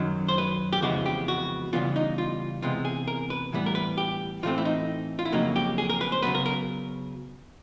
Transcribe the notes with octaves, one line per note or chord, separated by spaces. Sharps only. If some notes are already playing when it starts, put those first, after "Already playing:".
Already playing: F#2 D#3 F#3
C5
B4
G4
F2 C#3 E3 G#3 B3 F#4
G4
F#4
C#3 E3 G3 B3 F4
D#4
F4
C3 E3 G#3 B3 F4
G#4
A#4
B4
A2 E3 G3 B3
A#4
B4
G4
A2 E3 A3 C4 F4
E4
D#4
F4
E4
F2 C#3 F#3 A#3 D#4
G4
G#4
A#4
B4
C5
C#3 F#3 B3 B4
A#4
A#4